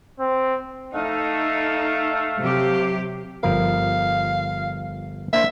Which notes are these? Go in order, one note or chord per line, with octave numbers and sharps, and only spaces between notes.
C4
A3 D#4 F5
C3 F#3 G4
G1 F3 A#4 F5
A#3 D4 C5 E5